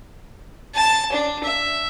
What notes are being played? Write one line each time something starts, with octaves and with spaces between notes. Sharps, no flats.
A5
D4
E5